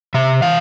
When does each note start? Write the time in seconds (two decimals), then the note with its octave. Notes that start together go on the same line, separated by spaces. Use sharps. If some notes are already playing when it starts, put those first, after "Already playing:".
0.14 C3 E5
0.42 E3 F5